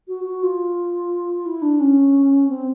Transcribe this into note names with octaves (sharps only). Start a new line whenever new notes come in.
F#4
F#4
F4
E4
D4
C#4
C4